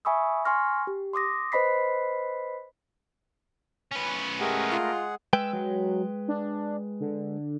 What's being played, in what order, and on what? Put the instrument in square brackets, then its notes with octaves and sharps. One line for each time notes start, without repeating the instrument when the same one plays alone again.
[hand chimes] E5 G#5 B5 C#6 D#6 E6
G#5 C6 C#6 F6 A#6
G4
C6 D6 D#6 A#6
B4 C5 D#5 B5 B6 C7
[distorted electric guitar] C#4 B4
[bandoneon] G#3 G#4 F#5 [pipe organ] A3 A#4 [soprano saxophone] G4
[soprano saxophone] F4
[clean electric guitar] G#3 B4 G5 [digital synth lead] E6
[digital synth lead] F#3
D4
D3